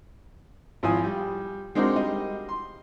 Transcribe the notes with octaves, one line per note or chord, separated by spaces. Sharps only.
G#1 F3 E4 F5 G#5 D#6
G3
G#3 C4 D4 D#4 F#4 A#4
G3 D#5
C6